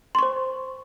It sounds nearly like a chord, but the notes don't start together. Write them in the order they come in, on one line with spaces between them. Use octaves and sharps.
C6 C#6 C5